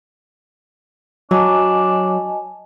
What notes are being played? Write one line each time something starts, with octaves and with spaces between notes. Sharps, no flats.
F#3 D4 D#5 G#5 A5